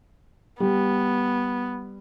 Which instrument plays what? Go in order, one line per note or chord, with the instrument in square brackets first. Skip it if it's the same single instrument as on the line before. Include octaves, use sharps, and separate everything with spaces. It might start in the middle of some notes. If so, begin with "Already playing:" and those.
[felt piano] G3 [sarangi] B3